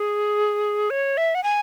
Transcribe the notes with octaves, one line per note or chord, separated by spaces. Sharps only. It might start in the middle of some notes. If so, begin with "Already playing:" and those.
Already playing: G#4
C#5
E5
F#5
G#5